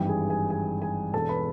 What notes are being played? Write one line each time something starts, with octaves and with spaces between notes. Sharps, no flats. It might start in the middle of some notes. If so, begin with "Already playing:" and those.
Already playing: G#1 G2 E3 G4 G5
G#4 G#5
G#4 G#5
G#4 G#5
G#4 G#5
E1 E2 B2 A4 A5
B4 B5